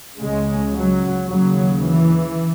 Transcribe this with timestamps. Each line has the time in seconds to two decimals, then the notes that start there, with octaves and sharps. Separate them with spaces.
0.19 C#2 C#3 G#3
0.73 F#3
1.27 D#2 C#3 F#3
1.80 E3